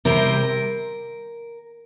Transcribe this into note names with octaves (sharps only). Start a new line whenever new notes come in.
C3 G3 C4 A#4